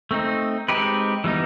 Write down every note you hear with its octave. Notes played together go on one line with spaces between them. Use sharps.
A3 C4 D#4
G#3 C4 D#4 G4 B4
E3 G3 B3 D#4